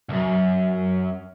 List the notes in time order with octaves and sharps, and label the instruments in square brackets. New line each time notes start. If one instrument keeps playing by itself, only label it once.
[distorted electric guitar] C2 F#2